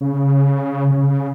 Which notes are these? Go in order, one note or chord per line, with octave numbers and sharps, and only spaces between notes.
C#3
C#3